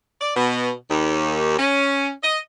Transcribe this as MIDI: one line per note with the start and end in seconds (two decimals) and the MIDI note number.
0.21 0.32 74
0.36 0.71 47
0.90 1.58 39
1.58 2.11 61
2.23 2.38 75